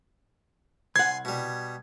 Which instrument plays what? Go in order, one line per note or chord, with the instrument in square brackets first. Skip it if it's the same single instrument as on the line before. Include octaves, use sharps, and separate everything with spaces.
[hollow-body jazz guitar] C2 F#5 [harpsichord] G#5 C6 [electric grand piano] G#6
[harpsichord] B2 G3